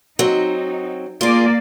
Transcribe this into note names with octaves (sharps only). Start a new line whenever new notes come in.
F#3 C4 D#4
A#3 F4 G#4 D5